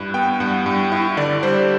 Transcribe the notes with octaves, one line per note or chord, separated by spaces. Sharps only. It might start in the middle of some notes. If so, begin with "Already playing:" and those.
Already playing: G2 E4 F#6
B3 G5
G2 F#5
G2
E4
D3 D5
G3 C5